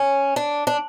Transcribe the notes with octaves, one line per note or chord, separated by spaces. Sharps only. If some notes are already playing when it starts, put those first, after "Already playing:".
Already playing: C#4
D4
D4